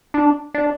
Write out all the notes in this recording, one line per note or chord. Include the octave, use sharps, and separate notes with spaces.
D4
D4